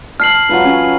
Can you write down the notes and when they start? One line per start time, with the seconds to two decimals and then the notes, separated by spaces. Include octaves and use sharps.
0.20 A5 F6 C7 F#7
0.49 F#3 F4 B4
0.65 C#4